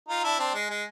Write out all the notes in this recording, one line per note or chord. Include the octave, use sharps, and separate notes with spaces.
D#4 F4
D4 E4
C4 D4
G#3
G#3